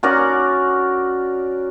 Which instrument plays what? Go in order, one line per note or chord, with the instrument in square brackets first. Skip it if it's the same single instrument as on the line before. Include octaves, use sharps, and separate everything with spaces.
[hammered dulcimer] C#4 F#4 A#4 D5